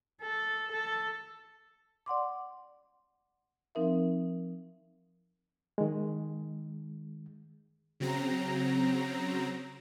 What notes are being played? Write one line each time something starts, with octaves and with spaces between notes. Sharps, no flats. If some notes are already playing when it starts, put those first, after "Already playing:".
A4
A4
D5 F#5 C6 D6
F3 C4 D#4 A#4 E5
D#3 G#3
C#3 F#3 C4 A#5